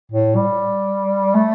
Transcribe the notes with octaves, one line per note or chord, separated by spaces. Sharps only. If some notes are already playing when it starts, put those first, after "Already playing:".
A2
G3
A3